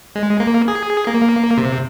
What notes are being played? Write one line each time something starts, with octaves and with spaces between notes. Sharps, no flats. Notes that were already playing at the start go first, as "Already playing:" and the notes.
G#3
A#3
G#4
A#3
C3